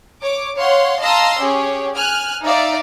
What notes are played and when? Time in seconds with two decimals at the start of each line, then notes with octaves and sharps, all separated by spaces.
0.22 C#5 D6
0.57 C#5 F5 F#5 C6
1.01 D#5 F5 A5 A#5 C6 E6
1.40 C#4 G4 G#4 C#5
1.94 G#5 F6 F#6
2.44 D#4 D5 E5 F5